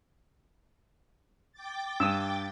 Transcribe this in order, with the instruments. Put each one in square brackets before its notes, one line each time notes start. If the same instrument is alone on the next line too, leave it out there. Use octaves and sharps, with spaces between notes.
[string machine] G5 D6 A6
[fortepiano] G2 [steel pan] D#6 E6